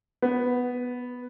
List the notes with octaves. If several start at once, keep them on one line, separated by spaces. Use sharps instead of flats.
B3